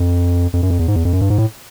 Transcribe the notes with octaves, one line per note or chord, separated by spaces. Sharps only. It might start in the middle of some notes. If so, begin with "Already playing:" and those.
Already playing: F2
F2
F#2
F2
E2
G#2
E2
F2
F#2
G2
G#2
A2